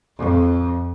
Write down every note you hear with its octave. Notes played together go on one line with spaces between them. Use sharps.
F2